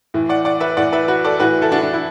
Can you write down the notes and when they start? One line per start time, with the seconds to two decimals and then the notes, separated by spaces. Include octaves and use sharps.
0.14 A2 E3
0.29 D5 F#5
0.45 D5 F#5
0.60 B4 E5
0.77 A2 E3 D5 F#5
0.93 B4 E5
1.08 F#4 B4
1.25 A4 D5
1.40 A2 E3 F#4 B4
1.61 E4 A4
1.72 D4 F#4
1.82 D4
1.94 E4